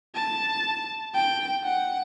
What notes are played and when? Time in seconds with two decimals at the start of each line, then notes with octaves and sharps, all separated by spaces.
0.15 A5
1.14 G5
1.64 F#5